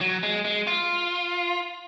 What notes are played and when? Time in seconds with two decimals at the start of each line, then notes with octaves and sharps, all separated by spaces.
0.01 F#3
0.23 G#3
0.45 G#3
0.67 F4